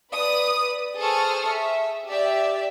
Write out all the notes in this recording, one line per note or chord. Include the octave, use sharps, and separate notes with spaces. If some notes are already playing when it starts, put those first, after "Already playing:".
B4 D5 D#6
G#4 A4 C5 C#6 D#6 F6
E5
G4 D5 E5